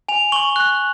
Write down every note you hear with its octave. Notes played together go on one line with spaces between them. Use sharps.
G#5 F7
C#6 F#7
F#6